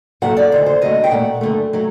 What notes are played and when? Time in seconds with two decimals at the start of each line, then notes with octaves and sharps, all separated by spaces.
0.22 A2 F#3 A3 F#5
0.37 D5
0.52 D2 C3 D#3 C5
0.66 C5
0.81 D#2 D3 F#3 A3 D#5
1.04 G5
1.11 A#2 A3 F#5
1.41 F#2 D3 A3
1.73 F#3 A3